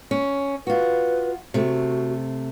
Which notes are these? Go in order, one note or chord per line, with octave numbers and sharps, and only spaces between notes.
C#4
F4 F#4 B4
C3 A3 F#4